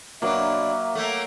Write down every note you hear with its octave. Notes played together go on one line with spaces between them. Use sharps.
B2 F#3 A#3 D4 E5
A3 A#3